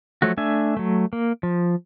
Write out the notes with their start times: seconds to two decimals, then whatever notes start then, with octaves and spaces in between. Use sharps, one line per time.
0.22 F3 F#3 A3 F#4
0.37 A3 D4 E5 G#5
0.77 F#3 A3
1.13 A#3
1.43 F3